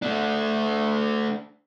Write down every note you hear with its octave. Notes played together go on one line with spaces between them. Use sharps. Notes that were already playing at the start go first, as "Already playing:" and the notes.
A3 D4